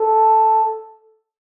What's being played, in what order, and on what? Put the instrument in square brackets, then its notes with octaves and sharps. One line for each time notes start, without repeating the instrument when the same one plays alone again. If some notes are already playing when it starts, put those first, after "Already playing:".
Already playing: [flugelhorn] A4